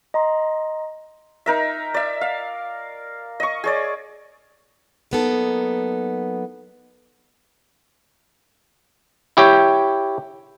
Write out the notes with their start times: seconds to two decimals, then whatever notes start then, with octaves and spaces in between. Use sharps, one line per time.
0.14 D#5 A#5 C6
1.46 D#4 A#4 E5
1.94 D5 E5
2.21 F5
3.40 D#5 C#6
3.64 G#4 C#5 D5
5.11 F#3 A#3 B3 D#4 A4
9.37 E4 G4 C#5 G5